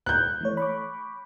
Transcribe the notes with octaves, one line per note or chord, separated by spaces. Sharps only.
F#6 G6
E3 A3 C#5
B5 C#6 D6